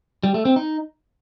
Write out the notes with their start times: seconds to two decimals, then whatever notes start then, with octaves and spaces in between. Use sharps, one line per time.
0.23 G3
0.34 A3
0.45 C4
0.56 D#4